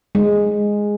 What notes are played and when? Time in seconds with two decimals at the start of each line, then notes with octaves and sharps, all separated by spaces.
0.15 G#3